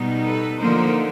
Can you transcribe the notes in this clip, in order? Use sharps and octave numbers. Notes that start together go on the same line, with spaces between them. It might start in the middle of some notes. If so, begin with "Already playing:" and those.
Already playing: B2 G3 B3 D#4
A4 B4
D3 F3 A#3 D#4 A#4 C5